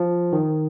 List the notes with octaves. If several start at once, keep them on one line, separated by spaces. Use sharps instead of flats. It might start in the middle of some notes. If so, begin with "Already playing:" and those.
Already playing: F3
D#3